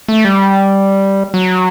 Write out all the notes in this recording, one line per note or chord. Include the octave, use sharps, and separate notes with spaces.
A3
G3
F#3